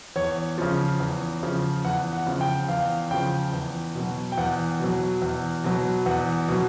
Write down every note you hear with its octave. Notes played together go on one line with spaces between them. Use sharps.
E2 C#5
C#3 F3
E2
C#3 F3
E2 F#5
F#5
C#3 F3
G5
E2 F5
C#3 F3 G5
E2
B2 F#3
G5
E2 F#5
B2 F#3
E2
B2 F#3
E2 F#5
B2 F#3